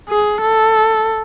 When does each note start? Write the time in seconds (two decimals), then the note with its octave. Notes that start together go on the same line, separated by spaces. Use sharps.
0.10 G#4
0.42 A4